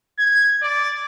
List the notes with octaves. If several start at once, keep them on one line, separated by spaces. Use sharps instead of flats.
G#6
D5